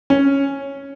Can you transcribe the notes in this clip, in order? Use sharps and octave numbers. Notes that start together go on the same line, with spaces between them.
C#4